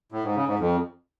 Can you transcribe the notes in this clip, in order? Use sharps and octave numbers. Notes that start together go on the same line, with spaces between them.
A2
G#2
C#3
G#2
F2